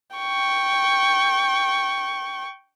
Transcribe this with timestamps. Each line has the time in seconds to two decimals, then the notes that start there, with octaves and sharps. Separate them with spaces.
0.16 G5 C#6